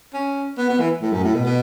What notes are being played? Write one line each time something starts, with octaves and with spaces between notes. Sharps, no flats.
C#4
B3
B3
E3
A2
F#2
A2
B2
B2